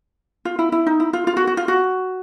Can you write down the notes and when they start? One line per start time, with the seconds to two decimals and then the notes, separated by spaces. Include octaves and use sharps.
0.45 F4
0.59 E4
0.72 E4
0.86 D#4
1.00 E4
1.13 F4
1.27 F4
1.37 F#4
1.47 F#4
1.57 F4
1.68 F#4